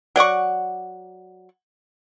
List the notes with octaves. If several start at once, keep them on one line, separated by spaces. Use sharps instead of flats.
F#3 D5 F#5 C#6